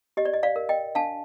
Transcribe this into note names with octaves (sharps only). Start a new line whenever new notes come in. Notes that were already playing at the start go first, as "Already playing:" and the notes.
G4 D#5
D5
D#5
D5 F5
A#4
D#5 G5
D4 F5 A5